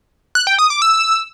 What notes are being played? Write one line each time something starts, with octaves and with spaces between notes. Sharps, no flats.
F#6
G5
D#6
D6
E6